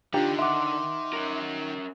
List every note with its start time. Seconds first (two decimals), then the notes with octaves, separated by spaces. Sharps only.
0.14 D3 D#3 D4 F4 G4 A#5
0.38 E5 F#5 C6 D6
1.13 C#4 A#4